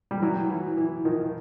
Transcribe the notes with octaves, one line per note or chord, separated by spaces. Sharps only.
G3
E3 F#3
E3
E3
D#3 F3